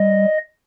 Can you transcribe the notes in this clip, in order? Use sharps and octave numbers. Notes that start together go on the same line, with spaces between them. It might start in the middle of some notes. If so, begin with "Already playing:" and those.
Already playing: G3 D#5